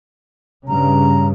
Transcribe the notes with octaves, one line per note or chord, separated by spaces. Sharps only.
G2 C#3 A#5